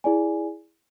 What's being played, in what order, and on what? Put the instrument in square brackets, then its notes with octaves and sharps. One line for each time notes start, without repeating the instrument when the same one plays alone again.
[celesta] E4 G#4 D5 G#5